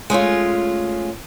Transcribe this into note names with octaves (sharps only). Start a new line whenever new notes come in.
G#3 A3 C#4 F4